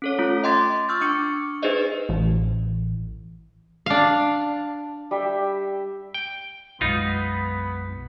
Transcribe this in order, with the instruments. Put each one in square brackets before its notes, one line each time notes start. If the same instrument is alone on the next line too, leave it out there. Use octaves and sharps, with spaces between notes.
[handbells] C#4 A4 C#5
A3 C#4 F4
D#5 G5 C6 D6 A6
C#6 E6 F6 G6 A6
D4 C#6 D6 C#7
D#4 G#4 B4 C5 D5 D#5
[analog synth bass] A1
[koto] D4 F5
[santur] G3 E5 G5
[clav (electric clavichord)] G5
[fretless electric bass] B1 F#2 G#3 [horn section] B3 B5 [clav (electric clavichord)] D#4 F4